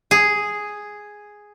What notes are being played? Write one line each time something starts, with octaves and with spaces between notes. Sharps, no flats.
G#4